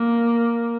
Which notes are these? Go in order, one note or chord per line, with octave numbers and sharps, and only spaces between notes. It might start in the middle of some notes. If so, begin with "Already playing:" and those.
Already playing: A#3